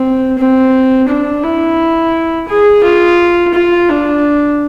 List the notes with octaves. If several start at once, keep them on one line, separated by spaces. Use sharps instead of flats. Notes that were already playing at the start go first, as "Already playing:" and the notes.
Already playing: C4
C4
D4
E4
G#4
F4
F4
D4